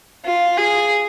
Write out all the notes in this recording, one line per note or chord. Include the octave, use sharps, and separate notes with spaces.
F4
G#4